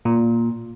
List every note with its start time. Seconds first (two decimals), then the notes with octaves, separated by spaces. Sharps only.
0.05 A#2